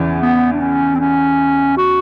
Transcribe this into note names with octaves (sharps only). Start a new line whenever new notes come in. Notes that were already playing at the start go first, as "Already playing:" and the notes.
Already playing: E2 C#3 E3
B3
D4
C#4
C4
C#4
F#4